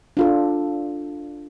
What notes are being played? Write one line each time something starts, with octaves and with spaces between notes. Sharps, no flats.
D4 F4 A4